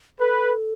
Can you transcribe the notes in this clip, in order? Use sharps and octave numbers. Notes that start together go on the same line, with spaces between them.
A4 B4